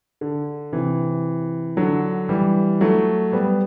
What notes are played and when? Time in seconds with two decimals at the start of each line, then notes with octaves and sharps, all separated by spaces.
0.21 D3
0.72 C3 E3
1.77 D3 F#3
2.29 E3 G3
2.81 F#3 A3
3.33 G3 B3